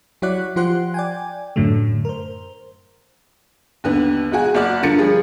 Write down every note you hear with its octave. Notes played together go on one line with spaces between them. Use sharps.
F#3 E4 F#4 C#5 D5 F#6
F3 F4 G4 C5 F#5 F#6
D5 G5 G#5
F#2 A2 D3 F#3 A3
A#4 C5
D#2 D3 B3
B1 G#3 F#4 G#5
F#1 F#4 D5 F6
G2 D3 F4 A#4 A6 C#7
F3 G3 G#4